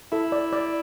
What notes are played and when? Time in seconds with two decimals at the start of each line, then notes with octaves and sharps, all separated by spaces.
0.12 E4 A4
0.32 D5
0.53 D5